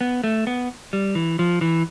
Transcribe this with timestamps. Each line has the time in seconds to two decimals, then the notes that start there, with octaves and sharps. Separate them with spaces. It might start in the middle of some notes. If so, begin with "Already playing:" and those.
0.01 B3
0.24 A3
0.47 B3
0.93 G3
1.15 E3
1.39 F3
1.61 E3